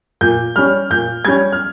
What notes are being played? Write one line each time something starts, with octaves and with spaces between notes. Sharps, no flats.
A#2 G6
G3 C#4 F6
A#2 G6
G3 C#4 G#6
F6